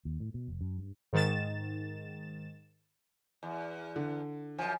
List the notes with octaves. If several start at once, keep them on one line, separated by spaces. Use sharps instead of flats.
D#2
A2
B2
F1
F#2
G2
G#2 D#3 A6 E7
E2
D3
F#2 F3 G#5